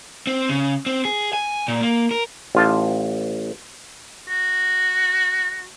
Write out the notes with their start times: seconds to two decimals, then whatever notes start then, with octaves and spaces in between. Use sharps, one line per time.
0.27 C4
0.49 C#3
0.86 C4
1.05 G#4
1.33 G#5
1.68 A#2
1.81 A#3
2.11 A#4
2.55 A1 F4 A5
4.29 F#4